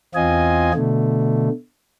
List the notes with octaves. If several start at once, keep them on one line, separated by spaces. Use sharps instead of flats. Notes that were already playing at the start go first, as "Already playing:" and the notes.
E2 C4 F4 D#5 G#5
B2 D3 A3